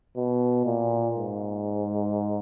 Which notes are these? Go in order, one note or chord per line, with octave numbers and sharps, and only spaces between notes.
B2
A#2
G#2